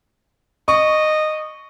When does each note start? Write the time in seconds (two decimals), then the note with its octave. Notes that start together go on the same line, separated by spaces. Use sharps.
0.68 D#5 C#6